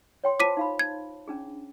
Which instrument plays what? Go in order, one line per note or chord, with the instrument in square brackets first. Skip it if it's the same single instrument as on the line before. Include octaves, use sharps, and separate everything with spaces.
[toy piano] C#5 G5 C6
[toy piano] F4 C5 A5 [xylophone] D6 B6 D#7
[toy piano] D#4 F5 B5
[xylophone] G#6
[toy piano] C#4 D4 G#4